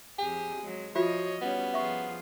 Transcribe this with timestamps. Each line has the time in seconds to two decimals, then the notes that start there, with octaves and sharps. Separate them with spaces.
0.19 F2 G4 G#4
0.61 F#3 G#3
0.96 F3 F4 F#4 C#5 D#5 E5
1.42 G3 B3 C#4 C#5
1.74 F3 F4 G#4 E5 C#6